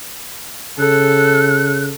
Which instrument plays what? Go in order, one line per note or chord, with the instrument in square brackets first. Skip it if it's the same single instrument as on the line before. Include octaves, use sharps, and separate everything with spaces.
[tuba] C#3 [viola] A4 [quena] F#6